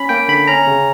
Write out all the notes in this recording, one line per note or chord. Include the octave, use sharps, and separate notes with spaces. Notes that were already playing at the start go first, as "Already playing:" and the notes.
Already playing: C#4 B5
A#3 G5
D3 B5
C#4 A#5
C#3